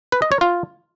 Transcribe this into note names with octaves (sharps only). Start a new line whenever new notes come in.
B4
D#5
C#5
F4